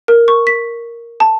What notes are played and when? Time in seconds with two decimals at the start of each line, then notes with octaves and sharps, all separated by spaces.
0.08 A#4
0.28 C#6
0.47 B6
1.20 A5